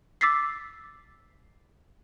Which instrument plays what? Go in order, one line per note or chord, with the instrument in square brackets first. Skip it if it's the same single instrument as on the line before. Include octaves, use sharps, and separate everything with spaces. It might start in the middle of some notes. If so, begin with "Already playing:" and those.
[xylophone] D6 E6 A6 B6 C7